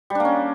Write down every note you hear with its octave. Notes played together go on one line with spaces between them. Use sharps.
G3 A#3 C#4 D4